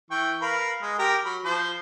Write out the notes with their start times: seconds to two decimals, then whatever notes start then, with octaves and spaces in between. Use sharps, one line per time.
0.11 E3 G5 C#6
0.42 A#4 B4 F5
0.82 G#3
0.99 G4 A#4 A#5
1.25 F#3 B5
1.45 F3 C5